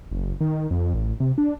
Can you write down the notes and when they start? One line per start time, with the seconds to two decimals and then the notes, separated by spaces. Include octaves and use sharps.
0.11 F#1
0.41 D#3
0.71 F2
0.94 A1
1.20 C3
1.38 D4